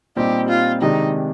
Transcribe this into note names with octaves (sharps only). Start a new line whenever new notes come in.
A#2 G3 C4 D#4 G4
F4
C3 D#3 G#3 D4 D#4